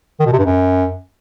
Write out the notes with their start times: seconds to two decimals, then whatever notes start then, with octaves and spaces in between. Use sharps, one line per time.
0.20 D#3
0.26 B2
0.33 C3
0.39 G2
0.45 F#2